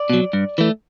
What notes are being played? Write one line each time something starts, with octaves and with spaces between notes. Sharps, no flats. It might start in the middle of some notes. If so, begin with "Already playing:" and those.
Already playing: D5
B2 F#3
G2
E3 A3